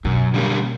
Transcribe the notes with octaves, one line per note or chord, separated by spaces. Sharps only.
F#2 B2
D3 G3 A#3 C#4